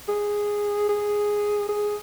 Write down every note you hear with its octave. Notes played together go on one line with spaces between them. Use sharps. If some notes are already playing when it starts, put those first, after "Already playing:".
G#4
G#4
G#4